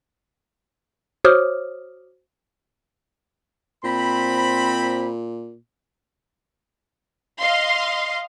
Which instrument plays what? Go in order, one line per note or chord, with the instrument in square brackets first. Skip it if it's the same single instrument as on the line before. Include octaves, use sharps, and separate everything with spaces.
[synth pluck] F#4 C5 C#5 D6 D#6 F6
[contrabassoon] A#2 [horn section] C4 B5
[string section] D#5 F5 C6